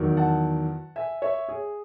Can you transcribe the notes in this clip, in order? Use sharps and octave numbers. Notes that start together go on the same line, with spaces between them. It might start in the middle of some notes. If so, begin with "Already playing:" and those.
Already playing: E2 D#3 F#3
F#5 A5
E5 G#5
C#5 E5
G#4